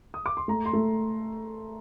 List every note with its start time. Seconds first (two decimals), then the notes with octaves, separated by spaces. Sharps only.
0.14 D#6
0.26 D6
0.37 C6
0.48 A3 A#5
0.66 C6
0.73 A3